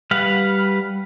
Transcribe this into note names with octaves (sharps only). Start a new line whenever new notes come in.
G3 B4 F5 F#5